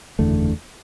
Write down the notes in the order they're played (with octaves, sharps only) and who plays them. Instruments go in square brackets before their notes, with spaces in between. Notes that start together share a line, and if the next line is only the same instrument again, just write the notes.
[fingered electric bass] F#1 E2 D3 A3